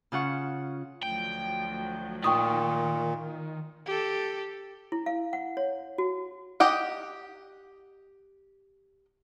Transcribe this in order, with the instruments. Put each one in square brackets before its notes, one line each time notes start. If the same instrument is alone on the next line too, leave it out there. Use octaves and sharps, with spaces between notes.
[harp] C#3 F4 F#5 C#6
[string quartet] D2 F3 F#3 [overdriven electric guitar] G5
[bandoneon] A#2 [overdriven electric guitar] D#3 [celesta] G5 C#6 D#6
[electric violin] G4 A4
[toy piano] E4
F5
F#5
C#5
F#4
[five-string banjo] G4 D#5 F#5